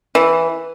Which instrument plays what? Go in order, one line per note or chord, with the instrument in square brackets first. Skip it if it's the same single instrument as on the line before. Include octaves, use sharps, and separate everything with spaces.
[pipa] E3